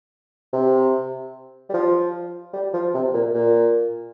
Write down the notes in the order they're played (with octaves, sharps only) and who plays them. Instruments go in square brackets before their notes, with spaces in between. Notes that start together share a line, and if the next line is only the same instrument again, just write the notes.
[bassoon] C3
G3
F3
G3
F3
C3
A#2
A#2